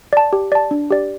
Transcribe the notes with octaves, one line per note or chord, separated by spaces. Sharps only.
D5 A5
G4
D5 A5
D4
G4 D5